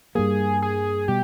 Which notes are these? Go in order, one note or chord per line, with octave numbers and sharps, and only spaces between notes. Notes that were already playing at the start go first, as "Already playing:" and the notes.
G2 G3 A#3 G#4
G#4
B2 G3 G4